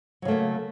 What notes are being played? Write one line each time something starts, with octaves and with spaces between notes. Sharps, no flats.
C#3 F#3 A3 A#3